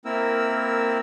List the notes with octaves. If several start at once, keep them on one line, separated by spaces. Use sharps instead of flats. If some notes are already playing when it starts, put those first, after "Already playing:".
A#3 C4 E4 A#4 E6